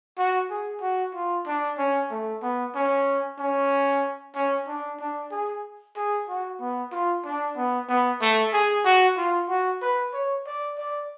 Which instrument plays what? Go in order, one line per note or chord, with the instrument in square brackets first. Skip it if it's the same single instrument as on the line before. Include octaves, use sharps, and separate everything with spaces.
[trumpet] F#4
G#4
F#4
F4
D4
C#4
A3
B3
C#4
C#4
C#4
D4
D4
G#4
G#4
F#4
B3
F4
D4
B3
B3
A3
G#4
F#4
F4
F#4
B4
C#5
D5
D5